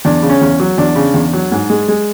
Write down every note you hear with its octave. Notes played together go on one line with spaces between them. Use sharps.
E2 D4
C#3
C#4
E2
F#3
E2 D4
C#3
E2
F#3
G#2
G#3
G#3